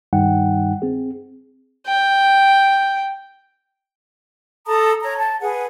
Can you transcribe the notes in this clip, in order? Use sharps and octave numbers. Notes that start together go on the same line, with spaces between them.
G2 D#3 G3 D#4 F#5 G5
C4 G#4
G5
A4 A5 A#5 D#6
C#5 A#5
A5
G#4 B4 F#5